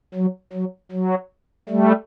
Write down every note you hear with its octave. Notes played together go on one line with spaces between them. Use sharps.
F#3
F#3
F#3
G3 A3